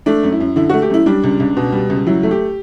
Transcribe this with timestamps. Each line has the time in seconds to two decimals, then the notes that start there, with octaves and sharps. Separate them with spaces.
0.06 A3 D4
0.23 F#2
0.32 E4
0.41 F#2
0.56 D3 E4
0.70 F#4
0.74 A3
0.82 G4
0.90 F#2 E4
1.06 G3 D4
1.24 C#2
1.40 C#2
1.57 B2
1.72 G3
1.90 C#2
2.07 F#3 E4
2.23 A3
2.31 G4